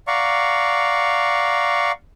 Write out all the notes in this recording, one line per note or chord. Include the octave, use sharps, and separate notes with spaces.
D5 F5 F#5 A#5 C#6